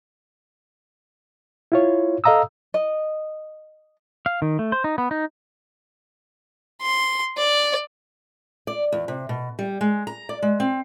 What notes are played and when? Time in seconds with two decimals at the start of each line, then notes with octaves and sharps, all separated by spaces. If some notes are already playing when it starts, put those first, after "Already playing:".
1.72 E4 F4 C#5
2.24 A4 D#5 F5 A#5 D#6 E6
2.74 D#5
4.26 F5
4.42 D#3
4.59 A3
4.72 C5
4.84 D#4
4.98 B3
5.11 D#4
6.81 C6
7.37 D5
8.67 D5
8.92 E2
9.08 C3
9.29 B2
9.59 G3
9.81 G#3
10.07 A#5
10.29 D5
10.42 G#3
10.60 C4